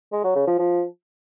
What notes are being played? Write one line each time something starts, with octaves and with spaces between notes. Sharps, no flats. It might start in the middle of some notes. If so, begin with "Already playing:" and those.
G#3
F#3
C#3
F3
F3